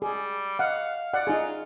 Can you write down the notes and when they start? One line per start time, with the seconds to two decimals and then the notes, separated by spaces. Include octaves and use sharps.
0.02 G3 G#4
0.59 D#5 F5 F#5
1.14 D5 F#5
1.27 D#4 F4 G#4